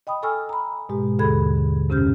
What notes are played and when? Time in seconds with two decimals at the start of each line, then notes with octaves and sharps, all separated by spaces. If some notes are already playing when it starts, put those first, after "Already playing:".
0.07 D#5 G5 B5 D#6
0.23 A4 G#5 C#6 E6 F6
0.49 A#5 B5
0.89 G#2 B2 G#3 G4
1.19 D#2 D3 G#4 A4 B5 G#6
1.89 F#2 C3 C#4 G4 F6 G6